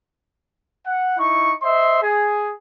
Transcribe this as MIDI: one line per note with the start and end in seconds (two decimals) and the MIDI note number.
0.86 1.16 78
1.18 1.53 63
1.18 1.53 64
1.18 1.53 85
1.62 2.01 72
1.62 2.01 75
1.62 2.01 76
1.62 2.01 84
2.02 2.52 68